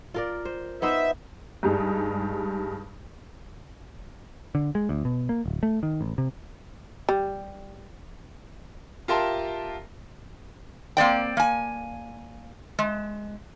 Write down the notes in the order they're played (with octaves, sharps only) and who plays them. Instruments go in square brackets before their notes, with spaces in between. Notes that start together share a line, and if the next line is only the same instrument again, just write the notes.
[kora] F4 A#4 D5
C5
[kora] B3 D#4 C5 [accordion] E5
[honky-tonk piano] G2 G3 G#3 D#4
[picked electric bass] D3
G#3
D2
B2
A#3
D1
A3
D#3
A1
C3
[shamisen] G3
[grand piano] F4 G4 A#4 E5 A5 C6
[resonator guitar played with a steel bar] A#3 C4 D5 G5
A#3 G#5
G#3